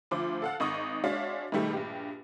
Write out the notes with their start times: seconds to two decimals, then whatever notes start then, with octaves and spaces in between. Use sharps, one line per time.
0.11 D2 F3 C5 D6
0.42 A4 F5 F#5
0.60 G#1 D#4 C#6 D#6
1.04 G#3 D4 F#4 C#5 E5 F5
1.52 G#2 B2 D#3 G3 A3
1.73 A#1 G2 G4